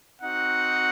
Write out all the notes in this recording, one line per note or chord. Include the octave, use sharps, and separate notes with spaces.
C4 D#4 F#4 F#5